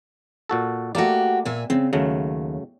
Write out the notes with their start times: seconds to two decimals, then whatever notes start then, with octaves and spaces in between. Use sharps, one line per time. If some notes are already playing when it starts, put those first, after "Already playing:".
0.49 A#2 F#4 A4
0.95 A3 A#3 F#4 G4 D5
1.45 A#2 E5 G#5
1.70 C#3 C4
1.93 D#2 C#3 F#3 A3